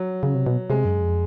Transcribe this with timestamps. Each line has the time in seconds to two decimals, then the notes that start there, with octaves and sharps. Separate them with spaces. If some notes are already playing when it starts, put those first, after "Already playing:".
Already playing: F#3
0.23 C#3
0.35 C3
0.47 B2
0.70 C3 G#3
0.85 F#2
1.01 F2